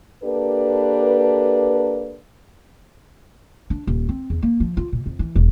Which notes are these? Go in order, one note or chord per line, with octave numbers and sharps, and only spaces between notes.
A#3 D4 G4 A4 B4
D4
D#1
C4
E2
A#3
F3
F4
A#2
F2
E3
E1